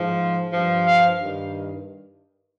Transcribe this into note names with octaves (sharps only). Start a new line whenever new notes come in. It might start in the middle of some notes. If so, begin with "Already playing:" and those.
Already playing: G#2 F3
G2 F3
F5
G2 D#3